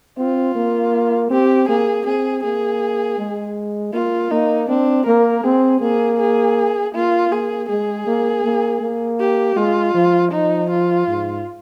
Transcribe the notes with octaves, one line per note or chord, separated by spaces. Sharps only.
C4 F4
A#3
C4 G4
A#3 G#4
C4 G#4
A#3 G#4
G#3
A#3 F4
A#3 D#4
C4 D4
A#3 A#4
C4 G#4
A#3 G#4
G#4
A#3 F4
A#3 G#4
G#3 G#4
A#3
A#3
A#3
G4
G#3 F4
F3
F3 D#4
F4
G#2